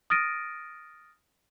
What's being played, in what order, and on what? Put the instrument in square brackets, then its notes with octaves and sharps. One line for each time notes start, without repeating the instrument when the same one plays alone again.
[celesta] D#6 F6 A6 A#6 D7 D#7